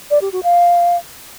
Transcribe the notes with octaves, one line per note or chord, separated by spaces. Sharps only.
D5
G4
F#4
F5